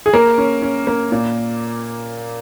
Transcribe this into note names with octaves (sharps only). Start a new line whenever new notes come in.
G#4
A#3 A#4
C#4
C#4
A#3
A#2